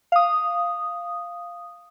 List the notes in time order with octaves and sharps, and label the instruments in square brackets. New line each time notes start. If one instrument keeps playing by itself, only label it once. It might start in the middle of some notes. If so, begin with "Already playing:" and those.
[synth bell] F5 D#6